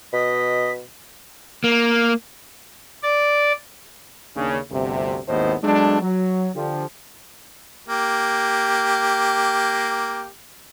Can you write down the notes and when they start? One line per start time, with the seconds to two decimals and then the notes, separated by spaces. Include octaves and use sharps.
0.13 B2 D#5 B6
1.64 A#3
3.03 D5
4.36 D#2 C#3 D4
4.71 G1 D2 C3
5.28 G#1 D#2 A2 B3 C5 D#5
5.63 F#3 G#3 A3 B3 D4
6.01 F#3
6.55 D3 F3 G4
7.88 A#3 G4